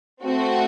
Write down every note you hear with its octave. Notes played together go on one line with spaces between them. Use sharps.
A3 C4 F#4